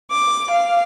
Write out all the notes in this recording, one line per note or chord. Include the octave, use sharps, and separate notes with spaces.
D6
F5